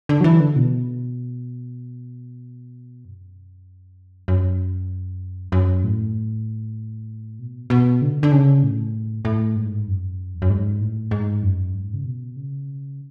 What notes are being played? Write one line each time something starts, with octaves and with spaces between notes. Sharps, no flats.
D3
F#3
E3
D3
B2
F#2
F#2
F#2
A2
B2
B2
D3
D3
C#3
A2
A2
G#2
F#2
E2
F#2
G#2
A2
G#2
F#2
G#2
C#3
B2
C#3